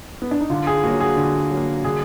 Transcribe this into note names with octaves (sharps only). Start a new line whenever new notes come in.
B3
D4
D#4
D3 F4
G#4
F#3 A#3 F#4
G#4
D3
F#3 A#3
D3 G#4